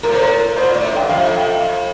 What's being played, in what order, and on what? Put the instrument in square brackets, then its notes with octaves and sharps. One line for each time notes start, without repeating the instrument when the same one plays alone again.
[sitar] A2 [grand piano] A#4
[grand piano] C5
A#4
[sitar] A#2 [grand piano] C5
[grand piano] D5
[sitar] A2
[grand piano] E5
[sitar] G2 [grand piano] G5
[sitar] F2 [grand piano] F5
[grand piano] E5
G5
F5